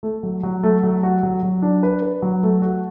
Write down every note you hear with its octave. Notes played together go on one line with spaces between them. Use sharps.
A3
F#3
F#3
A3
F#3
F#4
F#3
F#3
D4
B4
B4
F#3
A3
F#4